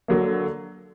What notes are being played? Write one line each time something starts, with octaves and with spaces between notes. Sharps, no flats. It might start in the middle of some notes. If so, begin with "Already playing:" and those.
D3 F#3 A#3